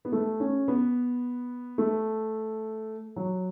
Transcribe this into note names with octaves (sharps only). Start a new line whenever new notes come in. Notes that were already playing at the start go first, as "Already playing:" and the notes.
B3
A3
C#4
B3
A3
F#3